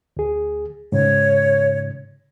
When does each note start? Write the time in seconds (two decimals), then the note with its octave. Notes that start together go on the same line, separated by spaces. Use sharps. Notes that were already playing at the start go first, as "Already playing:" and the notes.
0.17 D2 G#4
0.92 G#2 C#3 C#5